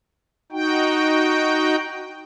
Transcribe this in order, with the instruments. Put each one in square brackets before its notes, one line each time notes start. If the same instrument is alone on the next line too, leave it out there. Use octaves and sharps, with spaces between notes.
[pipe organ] D#4 F#4 G5